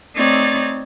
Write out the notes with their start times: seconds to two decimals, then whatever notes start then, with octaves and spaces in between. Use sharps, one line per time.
0.16 A3 C4 D#4 C#5 D5 A6